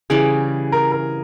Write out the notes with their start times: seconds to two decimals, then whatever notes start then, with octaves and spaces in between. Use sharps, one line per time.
0.10 C#3 E3 G3 G#4
0.72 A#4
0.92 A#4